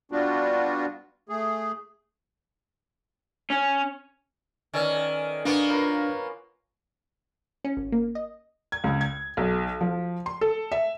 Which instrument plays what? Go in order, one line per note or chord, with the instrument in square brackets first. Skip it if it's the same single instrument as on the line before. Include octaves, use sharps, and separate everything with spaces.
[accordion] G3 B3 D4 F4 F#4
A3 G#4
[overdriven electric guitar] C#4
[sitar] D#3 [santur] C#4 A4 G#5 [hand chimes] B4 D5 F6
[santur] A4
[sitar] A#3 B3 [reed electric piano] D4 [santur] C#6
[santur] F4 A#4 B4 [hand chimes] C#5 A#5
[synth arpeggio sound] C#4
G#1
A#3
D#5
[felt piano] G#6
C#2
G#6
B1
F3
C6
A4
E5